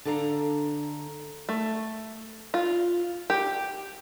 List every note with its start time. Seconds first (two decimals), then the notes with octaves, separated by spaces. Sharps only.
0.05 D3 D4 A4 F5 A#5
1.49 A3
2.54 F4
3.30 G4